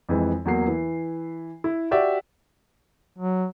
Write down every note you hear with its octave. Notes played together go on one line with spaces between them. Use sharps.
F2 E3 G#3
E2 F#3 A#3 C7
E3
E4
F#4 G4 D5 E5
F#3